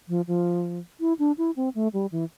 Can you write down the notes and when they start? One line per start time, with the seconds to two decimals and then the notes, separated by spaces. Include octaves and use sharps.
0.09 F3
0.27 F3
1.00 E4
1.19 D4
1.38 E4
1.56 C4
1.75 A3
1.93 G3
2.12 E3